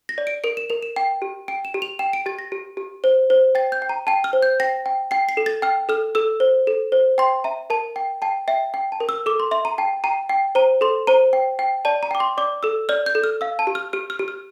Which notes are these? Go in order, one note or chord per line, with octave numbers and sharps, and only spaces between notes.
A#6
D5
D7
A#4 D7
E7
A#4 F7
E7
G5
G4
G5 D7
E7
G4
F7
G5 E7
D7
G4 A6
A#6
G4
G4
C5
C5
G5 A6
G6
G5
A#5
G5 A5
F6
C5
G6
G5 A#6
G5
G5 C7
C7
A4
A6
G5 F6
A4 F6
A4 E6
C5
A4
C5
G5 C6
E5 A#5
A#4 A5
G5
G5 A5
E5 G5
G5
A5
A#4
E6
A4 D6
C6
E5 C6
A#5
G5 A5
G5 A#5
G5
C5 A#5
A4 C6
C5 A#5
G5
G5
D5 A5
A#5
G5 D6
C6
D5 D6
A4 E6
D5 F6
G6
A4
F6
F5 E6
A5
G4
F6
G4 F6
F6
G4
F6